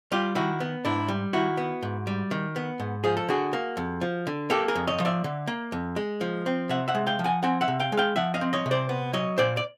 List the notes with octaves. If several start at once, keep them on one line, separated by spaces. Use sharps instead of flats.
G3 F4 G4
D#3 E4 F#4
B3
G#2 D4 E4
G3
D#3 E4 F#4
B3
G#2
G3
D#3
B3
G#2
F3 G#4
A4
D3 F#4 G#4
A#3
F2
F3
D3
A#3 G4 A4
G#4 A#4
F2
C#5 D#5
F3
D5 E5
D3
A#3
F2
G#3
F3
C4
C3 E5 F#5
E5 F#5
G#3
F5 G5
F3
F#5 G#5
C4 F#5 G#5
E5 F#5
C3
F5 G5
G#3
F5 G5
F3 E5 F#5
D#5 F5
C4
C#5 D#5
C3
C5 D5
B3
F#3 C#5 D#5
A#2 C5 D5
D5